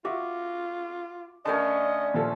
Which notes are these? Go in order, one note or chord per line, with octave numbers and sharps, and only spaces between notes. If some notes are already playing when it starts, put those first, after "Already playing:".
F4 F#4 E5 D6
D3 A3 C#4 A#4 D5 D#5 A5
A#2 F3 A4